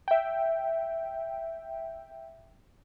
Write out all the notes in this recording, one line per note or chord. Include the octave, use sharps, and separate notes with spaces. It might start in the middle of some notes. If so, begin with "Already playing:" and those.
E5 G5